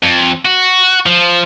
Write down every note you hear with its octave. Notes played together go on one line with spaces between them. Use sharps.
F2
F#4
F3